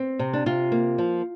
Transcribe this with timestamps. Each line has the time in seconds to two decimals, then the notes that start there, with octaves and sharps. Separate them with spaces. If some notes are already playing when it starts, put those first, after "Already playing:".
Already playing: C4
0.19 C3
0.33 D4
0.46 C3 F4
0.72 A#3
0.98 F3